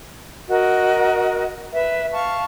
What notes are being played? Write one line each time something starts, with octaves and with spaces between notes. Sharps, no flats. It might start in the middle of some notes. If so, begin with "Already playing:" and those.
F#4 A#4 D#5
B4 E5
F5 A5 C#6